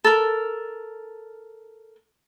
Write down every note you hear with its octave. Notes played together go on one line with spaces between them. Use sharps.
A4 A#4